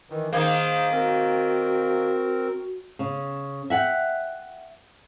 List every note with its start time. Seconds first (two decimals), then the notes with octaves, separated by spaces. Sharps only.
0.10 D#3 E3
0.33 D#3 A#3 D#4 G#4 C5
0.92 C4 F#4 A#4
2.99 C#3
3.70 E5 F#5 G5